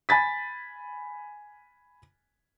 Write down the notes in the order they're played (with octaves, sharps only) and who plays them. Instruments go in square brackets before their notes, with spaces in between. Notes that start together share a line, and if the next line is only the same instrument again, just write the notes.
[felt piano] G#5 B5 A6 B6